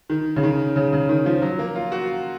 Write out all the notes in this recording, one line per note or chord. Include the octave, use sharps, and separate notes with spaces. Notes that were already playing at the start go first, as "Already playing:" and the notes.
D#3
C#3
D#3
C#3
C#3
D#3
F3
F#3
A#3
F4
F#4